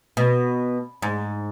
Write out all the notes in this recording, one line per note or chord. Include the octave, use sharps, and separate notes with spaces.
B2
G#2